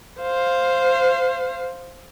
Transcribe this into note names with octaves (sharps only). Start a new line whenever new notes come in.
C5 F5